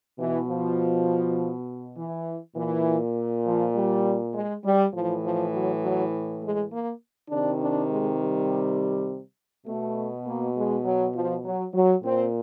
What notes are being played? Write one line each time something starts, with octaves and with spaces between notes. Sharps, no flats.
B2 E3
F3
E3
A#2 E3
F3
G3
G#3
G3
A2 E3 F3
F3
F#3
F#3
G#3
A#3
C3 D#3 D4
D4
G#3
G3
B2 A3
A#3
G#3
F#3
F3
F#3
F#3
A#2 C4